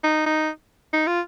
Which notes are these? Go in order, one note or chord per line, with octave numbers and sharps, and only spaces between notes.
D#4
D#4
D#4
F4